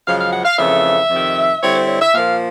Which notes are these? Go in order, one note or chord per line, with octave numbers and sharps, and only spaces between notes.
F#2 C#3 F3 G#3 F5
F5
F#5
F5
F2 C#3 E3 A3 E5
F2 C3 D#3
D3 G3 C4 E4 C#5
C5
C#5
E5
A#2 F3 A#3 F5